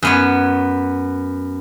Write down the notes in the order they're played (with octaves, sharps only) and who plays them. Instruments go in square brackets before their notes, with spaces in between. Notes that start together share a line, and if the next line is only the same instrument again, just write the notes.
[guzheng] F#2 B3 C#5